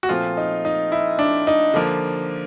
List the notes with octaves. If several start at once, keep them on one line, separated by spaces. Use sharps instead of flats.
F#4
A#2 F3 A3 C4 F4
D#4
D#4
E4
D4
D#4
D3 F3 A#3